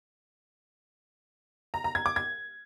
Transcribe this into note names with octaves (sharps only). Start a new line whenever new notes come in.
A#5
A#5
G#6
D6
G#6